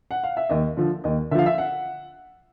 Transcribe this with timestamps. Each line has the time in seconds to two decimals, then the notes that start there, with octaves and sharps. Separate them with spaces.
0.11 F#5
0.23 F5
0.37 E5
0.50 D#2 D#5
0.77 D3 F3
1.04 D#2 D#5
1.31 D3 E5
1.35 F3 F5
1.46 E5
1.58 F#5